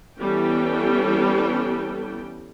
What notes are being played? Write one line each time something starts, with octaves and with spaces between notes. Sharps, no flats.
E3 G3 B3 C#4 A4 G5